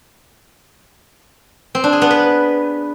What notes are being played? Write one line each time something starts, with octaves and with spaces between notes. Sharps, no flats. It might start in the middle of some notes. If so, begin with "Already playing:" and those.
C4
D4
G#4
B3
B4